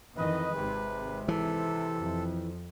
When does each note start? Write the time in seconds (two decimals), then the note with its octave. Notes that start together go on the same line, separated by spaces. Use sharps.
0.17 F2 D#3 E3 B4 D#5
0.54 G#1 C3 G#3
1.28 E3 A4
1.97 F2